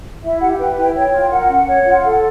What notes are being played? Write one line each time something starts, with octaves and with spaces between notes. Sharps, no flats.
E4 E5
G4 F#5
F#5
B4 G5
E4 G5
C#5 G5
F4
A#4 F#5
C#4
C#5
F4
A4